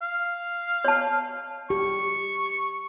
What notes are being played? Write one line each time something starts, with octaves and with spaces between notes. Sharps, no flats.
F5
C#5 A5
G4 C#6